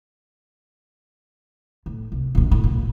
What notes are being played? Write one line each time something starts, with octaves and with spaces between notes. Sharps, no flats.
A2
C2
A#1 A#2
A2
A#2